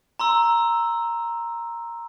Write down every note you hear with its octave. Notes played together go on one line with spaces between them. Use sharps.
A#5 C6 E6